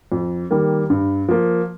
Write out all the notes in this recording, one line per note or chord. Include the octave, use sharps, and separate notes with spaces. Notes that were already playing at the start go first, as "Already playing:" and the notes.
F2
D#3 G3 A#3
G2
F3 A#3